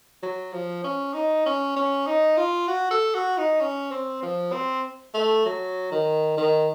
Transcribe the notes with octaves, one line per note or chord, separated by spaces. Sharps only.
F#3
F3
C#4
D#4
C#4
C#4
D#4
F4
F#4
A4
F#4
D#4
C#4
C4
F3
C4
A3
F#3
D#3
D#3